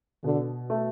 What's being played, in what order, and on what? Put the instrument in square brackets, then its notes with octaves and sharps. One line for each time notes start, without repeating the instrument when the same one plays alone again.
[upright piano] B2 [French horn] D3
[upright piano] A3